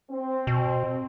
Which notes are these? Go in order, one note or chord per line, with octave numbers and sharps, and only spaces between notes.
C4
B2